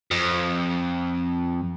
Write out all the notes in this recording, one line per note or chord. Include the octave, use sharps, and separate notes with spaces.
F2